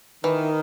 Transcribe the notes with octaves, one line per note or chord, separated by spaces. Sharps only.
D#3 E3